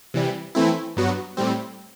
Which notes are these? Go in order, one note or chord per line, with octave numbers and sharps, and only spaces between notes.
C3 E3 G3
E3 A3 C4 E4
G2 F#3 B3 F#4
A2 G3 C4